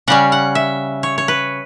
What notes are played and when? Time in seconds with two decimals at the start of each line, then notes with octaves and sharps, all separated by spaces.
0.08 C#3 G3 C#4 F#5
0.32 F#5
0.55 E5
1.03 C#5
1.18 C#5
1.28 B4